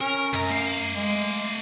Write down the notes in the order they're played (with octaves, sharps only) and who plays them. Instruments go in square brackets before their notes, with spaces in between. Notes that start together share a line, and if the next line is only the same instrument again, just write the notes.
[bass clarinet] C#4 [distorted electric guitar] A#4
[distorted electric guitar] C#2 A#5 [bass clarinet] F#2
[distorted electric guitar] A3 F5
[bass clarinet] G#3